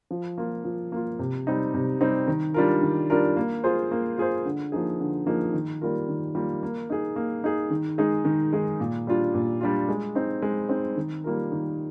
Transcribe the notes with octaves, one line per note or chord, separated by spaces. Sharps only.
F3
A#3 F4
F3
A#3 F4
C3
G3 C4 D#4
C3
G3 C4 D#4
D#3
G3 D4 F4 A#4
D#3
G3 D4 F4 A#4
A#3
F4 G#4 C5
A#3
F4 G#4 C5
D3
F3 A#3 D#4 G#4
D3
F3 A#3 D#4 G#4
D#3
G3 A#3 F4 A#4
D#3
G3 A#3 F4 A#4
A#3
D#4 G#4
A#3
D#4 G#4
D#3
G#3 D#4 G#4
D#3
G#3 D#4 G#4
A#2
G3 D4 F4
A#2
G3 D4 F4
G#3
C4 D#4
G#3
C4 D#4
D#3
G3 A#3 F4 A#4
D#3